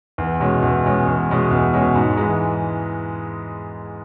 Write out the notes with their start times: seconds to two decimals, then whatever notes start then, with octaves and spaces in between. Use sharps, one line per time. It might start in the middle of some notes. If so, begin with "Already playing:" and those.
0.18 E2
0.40 B2 G#3 C#4
0.62 E2
0.85 B2 G#3 C#4
1.07 E2
1.30 B2 G#3 C#4
1.51 E2
1.73 B2 G#3 C#4
1.95 G#2
2.17 G#3
2.23 E3